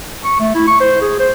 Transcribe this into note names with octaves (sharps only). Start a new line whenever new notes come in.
C#6
A3
E4
C#6
C5
G#4
C5